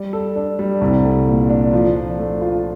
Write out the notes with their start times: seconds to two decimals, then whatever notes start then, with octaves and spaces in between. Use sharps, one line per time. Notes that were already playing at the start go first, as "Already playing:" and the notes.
Already playing: G3 D5
0.13 A4
0.36 D4
0.59 G3
0.81 C2
1.04 A3
1.27 A#2
1.50 D4
1.73 F3
1.95 D4
2.19 A3
2.41 F4